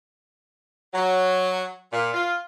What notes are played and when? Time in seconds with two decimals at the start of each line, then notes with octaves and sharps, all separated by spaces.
0.93 F#3
1.91 A#2
2.13 F4